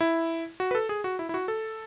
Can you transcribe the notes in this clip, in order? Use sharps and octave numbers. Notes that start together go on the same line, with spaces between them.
E4
F#4
B4
A4
G#4
F#4
E4
E4
F#4
A4